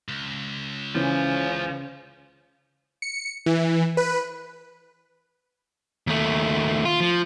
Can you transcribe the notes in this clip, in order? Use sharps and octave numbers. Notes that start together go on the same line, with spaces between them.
C#2
C#3 E3 F3 C#4
C#7
E3
B4
D#2 A3
F4
F3